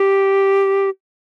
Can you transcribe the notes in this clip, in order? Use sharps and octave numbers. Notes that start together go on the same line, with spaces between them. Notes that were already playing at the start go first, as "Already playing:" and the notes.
Already playing: G4